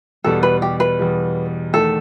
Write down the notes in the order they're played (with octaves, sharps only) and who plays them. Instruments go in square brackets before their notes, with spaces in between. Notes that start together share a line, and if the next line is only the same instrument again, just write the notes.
[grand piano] E2 B2 G3 [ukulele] A4
[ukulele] B4
G4
B4
[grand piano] E2 B2 G3
[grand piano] E2 D#3 A3 [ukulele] A4